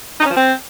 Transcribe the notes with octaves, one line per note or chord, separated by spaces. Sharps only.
D#4
C#4
F3
C4